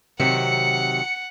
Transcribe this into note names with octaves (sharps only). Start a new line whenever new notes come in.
C3 D#3 F#3 C4 F#5 C#7